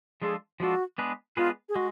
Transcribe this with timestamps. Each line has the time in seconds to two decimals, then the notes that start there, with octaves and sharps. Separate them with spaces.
0.21 F3 G#3 D4 F4 G#4 A4
0.60 F3 G#3 D4 F4 F#4 A4
0.98 G#3 B3 D4 G#4 B4
1.37 G#3 B3 D4 F4 G#4 B4
1.69 G#4
1.76 G#3 F#4